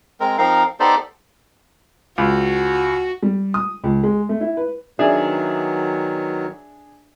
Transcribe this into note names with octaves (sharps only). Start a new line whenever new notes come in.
G#3 C4 A#4
F3 C4 D#4 A#4 F5
B3 D#4 G4 A4 C5 D5
C#2 F#4
G3
D#6
C#2
G#3
A3
E4
B4
D#3 F#3 B3 D4 G#4 E5